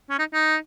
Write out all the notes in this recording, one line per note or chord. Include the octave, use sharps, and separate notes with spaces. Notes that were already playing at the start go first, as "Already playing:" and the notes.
C#4
D#4
D#4